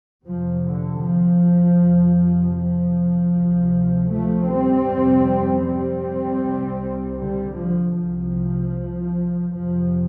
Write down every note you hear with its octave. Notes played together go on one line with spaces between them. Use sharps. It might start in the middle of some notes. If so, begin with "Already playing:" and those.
F2 C3 F3
D3
F3
F2 C3
F3
D2 C3
F3 A3
G3 C4
F2 C3
G3 C4
C2 C3
D3 G3
F3
C2 C3 F3
F2 C3 F3